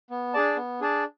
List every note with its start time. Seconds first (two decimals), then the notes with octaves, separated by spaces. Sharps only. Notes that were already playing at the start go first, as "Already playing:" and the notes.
0.10 B3
0.34 D4 G#4 D5 A5
0.56 B3
0.81 D4 G#4 D5 A5